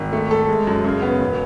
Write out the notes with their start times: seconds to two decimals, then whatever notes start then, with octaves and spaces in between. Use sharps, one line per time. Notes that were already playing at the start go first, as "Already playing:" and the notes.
Already playing: G#1
0.13 A3
0.31 A4
0.48 G#3
0.67 F#2
0.84 C#3
1.02 B3
1.20 E1